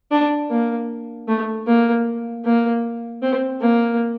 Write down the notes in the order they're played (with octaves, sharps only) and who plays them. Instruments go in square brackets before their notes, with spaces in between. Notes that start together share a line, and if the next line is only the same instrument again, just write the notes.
[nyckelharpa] D4
A#3
A3
A#3
A#3
C4
A#3